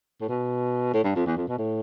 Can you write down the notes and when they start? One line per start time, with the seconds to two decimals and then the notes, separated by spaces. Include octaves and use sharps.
0.21 A2
0.28 B2
0.94 A2
1.04 G2
1.16 F2
1.26 E2
1.37 F2
1.48 B2
1.58 A2